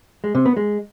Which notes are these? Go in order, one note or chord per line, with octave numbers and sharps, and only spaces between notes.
G#3
C3
B3
G#3